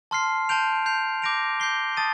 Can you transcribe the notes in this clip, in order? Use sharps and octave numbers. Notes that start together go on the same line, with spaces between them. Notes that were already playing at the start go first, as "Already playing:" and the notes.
A5 C6 F6 C7
A5 C6 G6 D7 F7
G6 C7 F7
D6 G6 A#6 D7 F7
G6 C7 G7
A5 D#6 A6 D#7